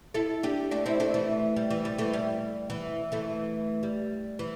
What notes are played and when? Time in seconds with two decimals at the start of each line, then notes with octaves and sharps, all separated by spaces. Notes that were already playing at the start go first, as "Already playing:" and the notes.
0.14 E4 A4
0.43 D4 G4
0.71 A3 D4
0.86 C4 E4
1.00 A3 D4
1.14 E3 A3
1.56 G3
1.70 E3
1.85 G3
1.98 E3 A3
2.13 G3
2.70 E3
3.12 E3 A3
3.83 G3
4.39 E3